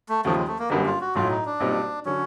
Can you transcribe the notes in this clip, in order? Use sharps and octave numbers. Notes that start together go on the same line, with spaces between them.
A3
D#2 C#3 F3 A3
G#3
A3
A#3
G1 F#2 D3 G3 A#3 B3
F4
F#4
B1 A2 F#3 F4
D#4
D4
B1 A#2 G3 C4 D#4
D3 F#3 C#4